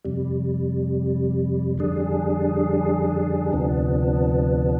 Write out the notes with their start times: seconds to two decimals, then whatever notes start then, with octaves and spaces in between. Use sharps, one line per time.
0.05 F2 C3 G3
1.78 F2 D3 G3 D4 G#4
3.52 D2 C3 F3 B3 D4